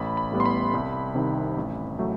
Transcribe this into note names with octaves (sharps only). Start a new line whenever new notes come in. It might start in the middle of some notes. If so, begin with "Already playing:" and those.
Already playing: A1 B5
B5
A2 G3 B3
C6
B5
C2
C3 D#3
A1
F#3 A3